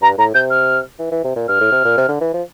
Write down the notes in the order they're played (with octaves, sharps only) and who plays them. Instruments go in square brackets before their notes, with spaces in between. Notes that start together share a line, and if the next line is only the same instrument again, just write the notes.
[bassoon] G2 [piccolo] A#5
[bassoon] A2 [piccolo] A#5
[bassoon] C3 [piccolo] G6
[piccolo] F6
[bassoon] E3
E3
C3
A#2
[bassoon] G2 [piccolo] F6
[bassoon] A2
C3
A#2
C3
D3
E3
F3